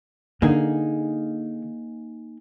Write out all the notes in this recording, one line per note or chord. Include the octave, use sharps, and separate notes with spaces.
D3 A#3 D#4 G#4